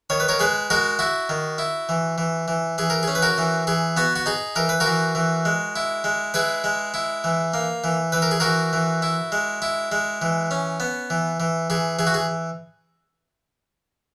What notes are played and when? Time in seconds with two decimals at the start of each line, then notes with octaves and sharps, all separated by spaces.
0.10 D#3 C#5
0.20 B4
0.28 A#4 C#5
0.39 G#3 G#4 B4
0.70 G#3 F#4 A#4
0.99 E4 F#4
1.29 D#3
1.58 E4
1.89 E3
2.18 E3
2.48 E3
2.78 E3 G#4
2.90 A#4
3.03 C#4 G#4
3.15 B4
3.22 F#4 A#4
3.38 E3
3.67 E3 G#4
3.97 B3 F#4
4.16 F#4
4.26 D#4 G#4
4.56 E3 A#4
4.69 B4
4.80 F#4 A#4
4.86 E3
5.15 E3
5.45 G#3
5.76 E4
6.04 G#3
6.34 E4 G#4 B4
6.64 G#3
6.94 E4
7.24 E3
7.54 A#3
7.84 E3
8.12 E3 B4
8.22 A#4
8.31 G#4
8.40 E3 F#4 A#4
8.73 E3
9.02 E4
9.32 G#3
9.62 E4
9.92 G#3
10.22 E3
10.51 C#4
10.80 B3
11.10 E3
11.40 E3
11.70 E3 G#4
11.99 E3 G#4
12.07 F#4
12.14 G#4